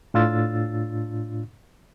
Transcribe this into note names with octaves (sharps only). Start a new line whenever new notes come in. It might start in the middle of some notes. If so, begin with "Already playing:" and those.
A2 D4 F4 E6 A6